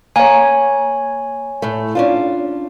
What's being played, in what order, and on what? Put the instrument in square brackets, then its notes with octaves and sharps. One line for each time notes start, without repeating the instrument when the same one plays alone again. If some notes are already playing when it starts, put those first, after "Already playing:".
[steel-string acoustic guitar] A#3 A#5 [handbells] C#5 G#5
[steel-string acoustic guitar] A2 A3
C#4 D4 F4